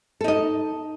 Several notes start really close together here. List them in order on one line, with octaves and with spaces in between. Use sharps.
A4 D#4 D#5